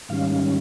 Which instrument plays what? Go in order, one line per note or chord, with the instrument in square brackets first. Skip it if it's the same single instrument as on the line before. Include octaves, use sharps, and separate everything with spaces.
[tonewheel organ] G#2 D#3 G3 C#4 F5